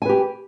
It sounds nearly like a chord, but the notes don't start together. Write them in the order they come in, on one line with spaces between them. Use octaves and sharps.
G#5 B4 G4